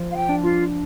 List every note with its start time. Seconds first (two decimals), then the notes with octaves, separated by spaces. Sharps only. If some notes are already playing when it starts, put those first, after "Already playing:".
Already playing: F3
0.11 F5
0.15 G5
0.29 D4
0.43 F4